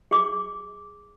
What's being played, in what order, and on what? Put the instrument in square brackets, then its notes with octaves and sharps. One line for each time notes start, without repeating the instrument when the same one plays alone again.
[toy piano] G#4 D6